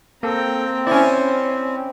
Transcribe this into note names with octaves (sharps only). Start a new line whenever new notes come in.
A#3 C4 A4 G5 A#5
C#4 E4 C5 D5